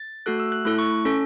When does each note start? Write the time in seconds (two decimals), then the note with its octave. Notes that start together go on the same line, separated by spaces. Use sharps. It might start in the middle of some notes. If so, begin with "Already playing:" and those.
Already playing: A6
0.26 A3 F#4 A4 F#6
0.40 E6
0.52 F#6
0.65 A3 E4 A4 F#6
0.78 C#6
1.05 C#4 A4